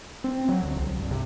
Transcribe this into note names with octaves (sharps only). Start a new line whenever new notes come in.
C4
F#3
D2
C2
G2
C3